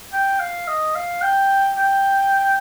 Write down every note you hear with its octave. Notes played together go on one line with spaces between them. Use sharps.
G5
F5
D#5
F5
G5
G5